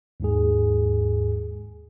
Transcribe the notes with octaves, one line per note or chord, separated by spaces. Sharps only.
D#2 G#2 G#4